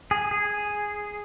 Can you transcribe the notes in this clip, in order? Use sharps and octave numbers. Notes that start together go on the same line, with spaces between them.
G#4
G#4